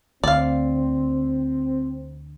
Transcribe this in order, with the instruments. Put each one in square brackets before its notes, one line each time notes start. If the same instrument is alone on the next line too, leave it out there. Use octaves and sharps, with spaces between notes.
[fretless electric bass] D2 [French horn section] C4 [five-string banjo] D5 F5